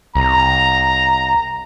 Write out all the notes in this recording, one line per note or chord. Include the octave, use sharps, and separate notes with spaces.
C2 A#5